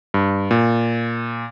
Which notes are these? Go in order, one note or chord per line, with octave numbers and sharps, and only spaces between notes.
G2
A#2